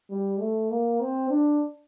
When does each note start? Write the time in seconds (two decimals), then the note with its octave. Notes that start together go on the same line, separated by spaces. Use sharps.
0.11 G3
0.40 A3
0.70 A#3
1.00 C4
1.30 D4